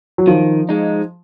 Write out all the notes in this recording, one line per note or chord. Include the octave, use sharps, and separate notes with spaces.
F#3
D#3 F3
G#3 D#4